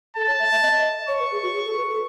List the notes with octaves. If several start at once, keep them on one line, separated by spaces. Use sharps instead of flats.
A4 A5
C#5
E5
E5
D#5
C#5 C#6
B4
G#4
F#4
G#4
A4
B4
A4